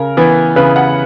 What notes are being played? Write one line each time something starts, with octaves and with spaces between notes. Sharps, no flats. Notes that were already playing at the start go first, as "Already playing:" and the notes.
Already playing: C#3 A#4
E3 B3
C#3 B4
F#5